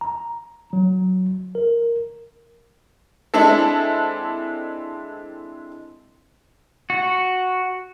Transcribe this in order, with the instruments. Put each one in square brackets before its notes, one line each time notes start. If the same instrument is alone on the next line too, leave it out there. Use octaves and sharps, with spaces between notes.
[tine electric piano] A#5
F#3
A#4
[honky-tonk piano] G#3 C4 D4 E4 A4
[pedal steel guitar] F#4